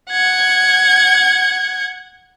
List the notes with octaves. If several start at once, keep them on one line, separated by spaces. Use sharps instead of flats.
F#5 G#6